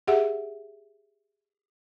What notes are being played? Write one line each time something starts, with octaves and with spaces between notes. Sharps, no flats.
G4 G#4 E5 F#5